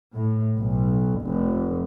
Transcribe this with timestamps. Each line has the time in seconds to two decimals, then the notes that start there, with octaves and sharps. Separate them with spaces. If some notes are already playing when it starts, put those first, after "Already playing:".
0.16 A2
0.57 B1
1.24 F1